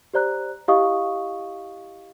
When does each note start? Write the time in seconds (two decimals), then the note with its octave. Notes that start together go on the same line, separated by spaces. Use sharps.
0.14 G4 C5 D5 A#5 F#6
0.68 E4 G4 D#5 F5 C#6 D#6